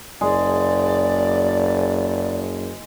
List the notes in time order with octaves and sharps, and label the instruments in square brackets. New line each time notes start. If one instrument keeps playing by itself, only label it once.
[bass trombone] F#1 [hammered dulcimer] G#3 [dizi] D5